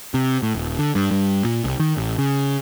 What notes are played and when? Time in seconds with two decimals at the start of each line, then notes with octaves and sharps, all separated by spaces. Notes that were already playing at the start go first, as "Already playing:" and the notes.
0.14 C3
0.43 A2
0.55 D#1
0.79 D3
0.95 G2
1.11 G2
1.45 A#2
1.64 C2
1.79 D#3
1.97 A1
2.18 C#3